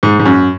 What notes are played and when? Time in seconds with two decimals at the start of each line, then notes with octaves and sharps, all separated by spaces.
0.03 G#2
0.19 G#2
0.25 F#2